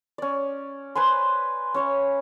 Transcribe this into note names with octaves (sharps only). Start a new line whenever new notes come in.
C#4 D5
B4 C5 G#5 C6
C#4 C#5 F5